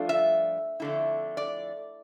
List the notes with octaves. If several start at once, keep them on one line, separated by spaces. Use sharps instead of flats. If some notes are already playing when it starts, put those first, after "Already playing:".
Already playing: G2 F3 A3 D4 F4
E5
F2 D3 A3 E4
D5